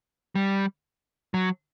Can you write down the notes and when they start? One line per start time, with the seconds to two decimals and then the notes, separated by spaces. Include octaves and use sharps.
0.35 G3
1.34 F#3